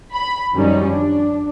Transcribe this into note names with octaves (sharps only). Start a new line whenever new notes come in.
B5
F#2 D#3 F3 G3 C#4 D#4
D4